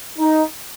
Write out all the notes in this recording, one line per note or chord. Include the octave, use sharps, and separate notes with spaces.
D#4